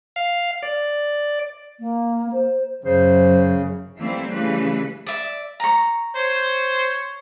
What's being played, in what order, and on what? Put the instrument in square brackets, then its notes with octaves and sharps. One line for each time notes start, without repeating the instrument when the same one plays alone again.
[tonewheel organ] F5
D5
[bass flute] A#3
C5
[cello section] F#2 F#3 [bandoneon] C#3 [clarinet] C5
[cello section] E3 G3 A3 A#3 C4 E4
C#3 E3 G3 A3 B4
[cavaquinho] D5 E5
A#5 C#6
[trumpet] C5 [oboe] C#5